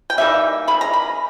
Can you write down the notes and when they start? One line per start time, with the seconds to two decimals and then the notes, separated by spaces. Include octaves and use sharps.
0.10 G5
0.18 E3 G3 A#3 D#4 E5
0.68 D#3 G#3 C#4 B5
0.81 A#5
0.93 B5